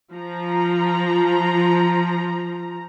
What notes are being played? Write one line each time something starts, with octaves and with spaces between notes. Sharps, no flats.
F3 A#5